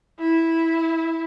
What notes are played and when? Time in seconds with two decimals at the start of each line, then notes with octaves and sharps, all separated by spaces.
0.19 E4